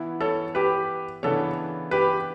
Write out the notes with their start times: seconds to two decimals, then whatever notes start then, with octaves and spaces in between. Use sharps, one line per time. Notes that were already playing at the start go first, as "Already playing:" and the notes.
Already playing: E3 B3 E4
0.21 A4 C#5
0.55 G4 B4
1.23 C#3 E3 B3 D4 A4 C#5
1.91 G4 B4